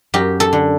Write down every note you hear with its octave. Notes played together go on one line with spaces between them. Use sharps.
F#2 G4
A4
D3